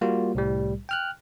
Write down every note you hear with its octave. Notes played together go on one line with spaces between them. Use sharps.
G3 A#3 F4 F#4
C2 A2 G3
G5 F6 F#6